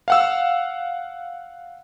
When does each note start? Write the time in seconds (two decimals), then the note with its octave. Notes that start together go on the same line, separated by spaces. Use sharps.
0.08 F5 F#5 E6